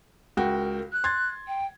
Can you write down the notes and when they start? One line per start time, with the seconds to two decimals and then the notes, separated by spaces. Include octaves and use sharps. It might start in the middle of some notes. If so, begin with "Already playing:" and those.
0.37 C#2 F#4 A#4 G5
0.92 F#6
1.04 C6 G#6 A6
1.47 G5